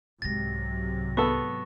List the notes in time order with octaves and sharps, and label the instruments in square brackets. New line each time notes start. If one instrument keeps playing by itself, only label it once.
[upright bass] C2 G#3 [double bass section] G#2 C3 F#3 [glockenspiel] A6 A#6
[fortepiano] B3 A4 [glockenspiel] C#6